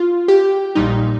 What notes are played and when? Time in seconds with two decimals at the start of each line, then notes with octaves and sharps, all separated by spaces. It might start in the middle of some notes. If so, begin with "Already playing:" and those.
Already playing: F4
0.28 G4
0.75 A#1 A#2 G3 D#4